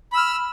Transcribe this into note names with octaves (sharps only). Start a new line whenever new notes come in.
B5 E6 F6